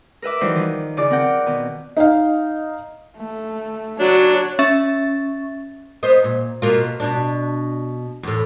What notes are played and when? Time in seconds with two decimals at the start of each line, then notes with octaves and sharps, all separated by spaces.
0.22 A#4 B4 E5 D6
0.41 E3 F3 G3 D#4 F#4 C5
0.55 D#3 F3
0.97 C#3 F4 D5 D6
1.10 C4 A#4 F#5 G6
1.46 B2 D#3
1.97 D#4 D#5 F5
3.16 A3
4.00 F#3 D4 F#4 C#5
4.59 C#4 E5 C#6 A6
6.03 B3 C5 D#5
6.24 A#2
6.62 B2 A#3 F4
7.00 B2 D4
8.23 E2 A2